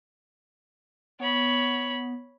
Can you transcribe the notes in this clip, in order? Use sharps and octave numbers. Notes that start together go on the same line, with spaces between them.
B3 C#5 B5